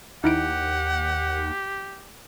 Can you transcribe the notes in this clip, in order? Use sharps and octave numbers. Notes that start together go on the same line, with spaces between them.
D#2 D#4 E4 G4 F#5 D7